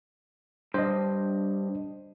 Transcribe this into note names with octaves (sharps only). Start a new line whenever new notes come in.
G2 C5 D#5